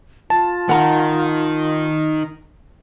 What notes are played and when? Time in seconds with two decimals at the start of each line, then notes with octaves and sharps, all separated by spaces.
0.30 F4 A5
0.69 D#3 F#5 A#5